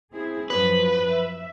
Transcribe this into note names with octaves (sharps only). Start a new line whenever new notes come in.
C4 E4 G#4
F#2 F3 B4
E5